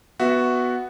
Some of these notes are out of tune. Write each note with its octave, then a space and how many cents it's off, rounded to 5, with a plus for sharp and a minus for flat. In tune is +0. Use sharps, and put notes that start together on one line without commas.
B3 +0 F#4 +0 E5 +0